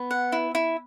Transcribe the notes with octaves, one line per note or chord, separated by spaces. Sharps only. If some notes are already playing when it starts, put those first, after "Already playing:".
Already playing: B3
F#5
E4
E4